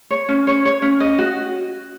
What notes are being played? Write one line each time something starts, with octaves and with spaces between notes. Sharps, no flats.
C#5
C#4
C#5
C#5
C#4
D#5
F#4